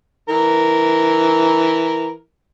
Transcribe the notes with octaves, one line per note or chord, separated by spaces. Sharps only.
E3 A#4